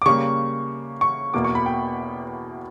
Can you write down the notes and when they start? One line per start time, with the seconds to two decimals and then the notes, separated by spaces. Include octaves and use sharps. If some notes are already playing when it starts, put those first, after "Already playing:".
0.02 D6
0.06 C#3 G3 A#3 C#6
1.01 C#6
1.34 E2 B2 A#3 D6
1.44 C#6
1.55 B5
1.66 G5